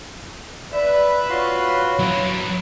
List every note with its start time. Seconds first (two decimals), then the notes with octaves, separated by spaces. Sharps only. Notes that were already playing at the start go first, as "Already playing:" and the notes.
0.72 B4 D5 E5
1.29 F4 F#4 C#5 C6
1.99 F#3 E4 E5